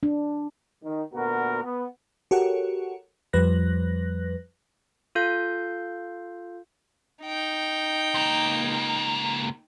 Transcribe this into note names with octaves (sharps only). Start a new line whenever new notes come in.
D4
D#3
D2 A#2 B3 F#4 A#4
B3
F#4 G4 A4 A#4 C#5 F#5
F2 F3 G3 B4 F#6 A#6
F4 A4 F5 G6
D#4 G5
C#2 A#3